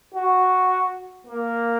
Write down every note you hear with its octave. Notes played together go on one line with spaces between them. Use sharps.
F#4
A#3